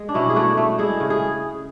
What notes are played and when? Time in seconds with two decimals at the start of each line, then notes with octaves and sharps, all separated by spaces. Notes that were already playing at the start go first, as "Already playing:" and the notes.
Already playing: G#3
0.09 D4
0.14 B2 C#4 E4
0.30 G#4
0.36 A3 D4 F#4
0.57 A3
0.78 G#3 E4 G#4
1.00 C#3
1.10 G#4